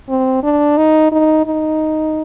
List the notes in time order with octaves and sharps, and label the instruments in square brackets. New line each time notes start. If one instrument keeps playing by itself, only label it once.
[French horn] C4
D4
D#4
D#4
D#4